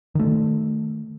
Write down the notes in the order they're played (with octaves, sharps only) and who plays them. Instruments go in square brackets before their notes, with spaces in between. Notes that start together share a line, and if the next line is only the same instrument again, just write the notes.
[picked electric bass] D#3 A3